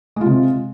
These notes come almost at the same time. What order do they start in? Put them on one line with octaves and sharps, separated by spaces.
G#3 F4 C3